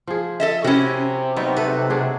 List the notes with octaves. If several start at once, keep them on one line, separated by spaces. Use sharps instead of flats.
F3 G#4
A4 D#5 E5
C3 C#4 E4 F#4 A#4
F#3 G3 B3 D#4
F#4 A4 B4
F#3 D4 G#4